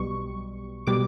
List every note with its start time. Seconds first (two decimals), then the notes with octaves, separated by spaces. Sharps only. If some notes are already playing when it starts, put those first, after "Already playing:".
Already playing: B1 B2 G3 C#6
0.87 B2 G3 D6